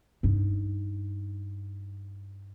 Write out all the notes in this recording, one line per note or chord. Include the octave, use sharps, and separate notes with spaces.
G2 D#4